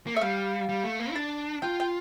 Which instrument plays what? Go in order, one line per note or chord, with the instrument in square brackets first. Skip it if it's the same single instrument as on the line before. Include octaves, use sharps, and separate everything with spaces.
[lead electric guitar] A#3
[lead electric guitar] A3 [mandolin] E5
[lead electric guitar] G3 [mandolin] F5
[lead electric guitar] G3
A3
A#3
E4
[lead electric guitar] D4 [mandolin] A5
[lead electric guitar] F4 [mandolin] G5
[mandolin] G5